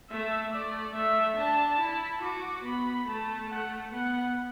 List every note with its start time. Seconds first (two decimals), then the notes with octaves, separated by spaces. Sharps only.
0.10 A3 E5
0.52 A3 D5
0.95 A3 E5
1.37 D4 A5
1.80 E4
2.23 F#4 D6
2.65 B3 B5
3.08 A3 A5
3.50 A3 F#5
3.92 B3 F#5